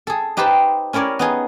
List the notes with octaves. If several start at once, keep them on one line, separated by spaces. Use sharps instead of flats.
G#4 A4
D#4 G4 B4 C5 A5 B5
C#4 E4 A#4 C#5 D5
B3 D#4 G#4